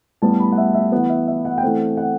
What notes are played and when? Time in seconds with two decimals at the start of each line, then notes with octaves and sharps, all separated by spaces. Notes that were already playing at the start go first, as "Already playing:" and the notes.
0.22 A2 G3 B3 A5
0.40 B5
0.52 F#5
0.58 E5
0.74 E5
0.92 E3 B3 F#5
1.09 E5
1.27 E5
1.45 F#5
1.58 G5
1.63 E3 A3 C4 F#5
1.97 F#5